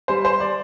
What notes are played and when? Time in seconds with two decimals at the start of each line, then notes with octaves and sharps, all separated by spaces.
0.08 G3 C5
0.25 C5
0.40 D5